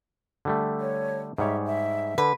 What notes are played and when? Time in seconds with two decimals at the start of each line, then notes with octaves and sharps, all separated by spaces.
0.45 D3 G3 A3
0.80 C#5
1.38 G#2 G3 C#5 E5
1.66 E5
2.18 D3 B4